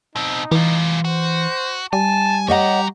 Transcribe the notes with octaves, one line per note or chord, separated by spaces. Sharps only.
B2 C4 D#4
E3 G3 F4
F#4 C5
G3 G#5 A5
F#4 G4 C#5 D#5 F#5 A#5